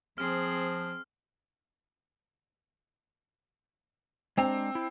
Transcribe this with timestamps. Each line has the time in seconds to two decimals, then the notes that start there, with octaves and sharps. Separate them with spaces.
0.18 F3 C4 G#4 F6
4.37 G#3 C4 D4 A#5
4.75 E4